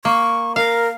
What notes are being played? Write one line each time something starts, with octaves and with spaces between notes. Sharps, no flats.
A#3 C#6
A#4 F5